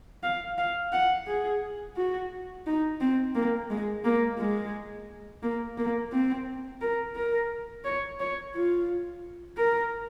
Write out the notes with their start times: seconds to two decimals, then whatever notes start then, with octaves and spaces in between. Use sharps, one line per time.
0.23 F5
0.58 F5
0.93 F#5
1.27 G#4
1.97 F#4
2.67 D#4
3.01 C4
3.35 A#3
3.70 G#3
4.04 A#3
4.39 G#3
5.43 A#3
5.78 A#3
6.12 C4
6.81 A#4
7.16 A#4
7.85 C#5
8.20 C#5
8.55 F4
9.58 A#4